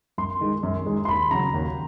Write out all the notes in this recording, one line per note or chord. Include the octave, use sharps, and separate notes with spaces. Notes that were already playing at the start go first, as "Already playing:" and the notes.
F#2 C6
D#3 G#3
F#2
D#3 G#3
C6
D#2 B5
C#3 F#3 A#5
D#2